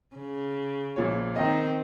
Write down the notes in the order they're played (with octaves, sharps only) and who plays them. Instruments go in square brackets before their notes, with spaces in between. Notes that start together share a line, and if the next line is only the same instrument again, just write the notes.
[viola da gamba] C#3
[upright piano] A#1 A#2 C#5
[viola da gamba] D#3 C4 [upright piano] D#5 G5